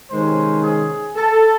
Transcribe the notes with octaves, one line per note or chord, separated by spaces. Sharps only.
C3 D#3 G#3 C#4 C5
G#4
A4